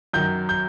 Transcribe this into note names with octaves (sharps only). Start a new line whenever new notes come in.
F#2 D#3 F#3 G6
G6